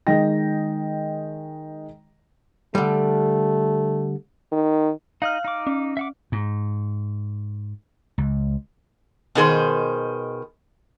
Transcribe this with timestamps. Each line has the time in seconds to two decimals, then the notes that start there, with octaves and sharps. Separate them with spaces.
0.07 D#3 G#3 D#5 G5 A#6
2.75 D3 G3 A3
4.52 D#3
5.22 D#4 D#5 F5 F6
5.44 D#4 D6
5.67 C#4
5.97 E5 F#5 D6
6.32 G#2
8.18 C#2
9.35 B2 D#3 G#4 C5